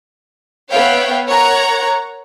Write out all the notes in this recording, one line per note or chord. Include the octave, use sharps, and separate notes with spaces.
B3 C#5 E5 F5 G5
A#4 C#5 F#5 A#5